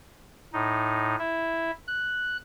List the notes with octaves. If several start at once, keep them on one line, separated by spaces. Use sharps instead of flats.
A2 D#4
E4 E5
F#6